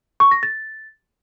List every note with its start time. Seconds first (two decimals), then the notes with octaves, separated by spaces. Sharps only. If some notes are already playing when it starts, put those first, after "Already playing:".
0.20 C#6
0.31 A#6
0.43 A6